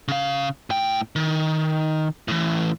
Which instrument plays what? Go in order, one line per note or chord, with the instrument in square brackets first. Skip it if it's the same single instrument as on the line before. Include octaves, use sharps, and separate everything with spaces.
[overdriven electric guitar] C#3 F5
A2 G5
D#3
A2 E3